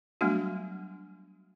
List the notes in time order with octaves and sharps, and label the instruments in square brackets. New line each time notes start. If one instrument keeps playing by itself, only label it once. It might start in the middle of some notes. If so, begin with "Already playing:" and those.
[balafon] F#3 G3 A3 B3 D4 F#4